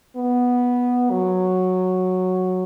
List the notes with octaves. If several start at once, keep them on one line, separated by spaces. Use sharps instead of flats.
B3
F#3